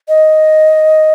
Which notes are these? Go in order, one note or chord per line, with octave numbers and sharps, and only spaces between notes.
D#5